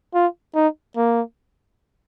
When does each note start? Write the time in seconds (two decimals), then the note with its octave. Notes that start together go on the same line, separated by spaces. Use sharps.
0.14 F4
0.55 D#4
0.96 A#3